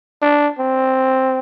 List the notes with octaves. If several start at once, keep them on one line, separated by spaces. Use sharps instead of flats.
D4
C4